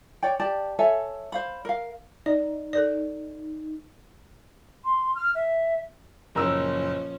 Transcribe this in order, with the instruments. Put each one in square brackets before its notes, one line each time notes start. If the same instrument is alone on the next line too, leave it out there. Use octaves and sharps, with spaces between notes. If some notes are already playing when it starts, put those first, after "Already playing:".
[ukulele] C#5 D5 G5
G4 D5 A5
A4 C#5 E5 G#5
C5 F5 B5
A#4 F5
[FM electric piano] D#4 [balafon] D5
[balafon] A4 A#4 D5
[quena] C6
F6
E5
[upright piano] F#1 A#4 E6 [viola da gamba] A#2 F3 C#4